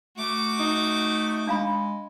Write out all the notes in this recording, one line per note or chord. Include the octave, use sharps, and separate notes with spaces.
A3 F#4 D6
D#4
G#3 D4 F5 B5